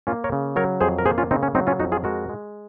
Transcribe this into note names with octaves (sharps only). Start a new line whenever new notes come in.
A#3 C#4 F4
A#4 C#5
C#3
F#3 A#4 C#5
F2 G#4 C5
A#4
A#3 G#4 C5
C#4 F4
C#3 C4 D#4
C#4
F#3 C4 D#4
C#4 F4
F2 D#4 F#4
F4 G#4
G#3 F#4 A#4
G#3